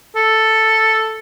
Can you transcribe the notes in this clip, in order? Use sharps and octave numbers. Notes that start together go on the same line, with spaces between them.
A4